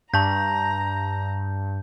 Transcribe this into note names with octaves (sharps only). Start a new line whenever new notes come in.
G2 A5 A#5 G6